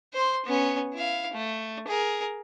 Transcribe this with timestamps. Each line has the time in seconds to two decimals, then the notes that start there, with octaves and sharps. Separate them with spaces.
0.13 C5 C6
0.45 B3 C#4
0.94 E4 F5
1.33 A3
1.87 G#4 A#4